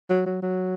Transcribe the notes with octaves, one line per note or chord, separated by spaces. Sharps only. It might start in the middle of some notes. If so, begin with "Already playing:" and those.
F#3
F#3
F#3